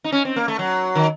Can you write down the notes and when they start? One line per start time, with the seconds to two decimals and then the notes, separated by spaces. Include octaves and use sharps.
0.04 D#4
0.12 C#4
0.25 C4
0.36 A#3
0.48 A3
0.59 F#3
0.95 D#3